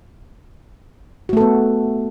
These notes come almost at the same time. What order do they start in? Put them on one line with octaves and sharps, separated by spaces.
F#4 A3 A4 B3